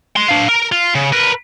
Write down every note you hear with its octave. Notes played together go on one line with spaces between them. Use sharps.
D#5 C6
D4 F5
A#4
F4
C#3
A#4 B4